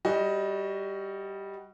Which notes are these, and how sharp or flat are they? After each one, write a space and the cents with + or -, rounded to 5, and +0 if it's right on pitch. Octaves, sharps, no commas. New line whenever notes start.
G3 +0 F#4 +15 D#5 +15